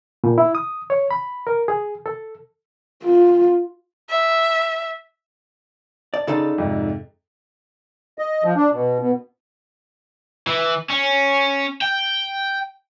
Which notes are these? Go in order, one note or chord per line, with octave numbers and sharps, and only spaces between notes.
A#2
E4
D#6
C#5
B5
A#4
G#4
A4
F4
E5
D5 A5
C#3 D#4 A4 D5 C6 A6
F2 G#2 C3
D#5
F3
D4
B2
B2
E3
C#4
G5